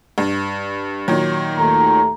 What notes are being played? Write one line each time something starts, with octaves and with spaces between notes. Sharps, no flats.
G2
A#2 D#3 F#3
D#2 A3 A#5